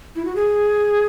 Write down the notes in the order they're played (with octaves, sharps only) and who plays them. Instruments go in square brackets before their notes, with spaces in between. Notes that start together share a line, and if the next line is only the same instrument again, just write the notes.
[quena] E4
F#4
G#4